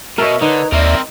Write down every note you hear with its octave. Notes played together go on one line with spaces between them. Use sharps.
B2 A#4 C#5 D#5 E5 E6
D3 D#4 B4 C#5 A#5
D#2 C4 A#4 D5 E5